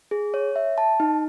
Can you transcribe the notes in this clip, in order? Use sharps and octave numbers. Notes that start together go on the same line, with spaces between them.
G#4
C#5
E5
A5
D#4